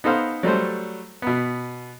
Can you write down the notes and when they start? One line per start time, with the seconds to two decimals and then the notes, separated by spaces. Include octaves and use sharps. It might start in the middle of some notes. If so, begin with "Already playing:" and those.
0.04 B3 D#4 A4 C5 F5
0.43 F#3 G3 A3 C5
1.22 B2 B3